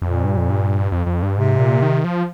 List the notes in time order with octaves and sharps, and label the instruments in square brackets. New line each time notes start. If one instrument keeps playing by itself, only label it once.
[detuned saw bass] F2 [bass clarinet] A#2
[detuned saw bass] G2
F2
G2
F2
F2
G2
[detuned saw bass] G#2 [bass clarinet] C3
[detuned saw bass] A#2
D#3
F3